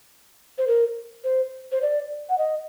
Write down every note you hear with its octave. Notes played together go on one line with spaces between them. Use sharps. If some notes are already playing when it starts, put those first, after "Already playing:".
C5
A#4
C5
C5
D5
F#5
D#5